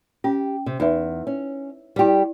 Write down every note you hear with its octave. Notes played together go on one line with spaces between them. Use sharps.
C#4 G4
C3
E2 D#4 B4 E5
C#4
G3 E4 G4 D5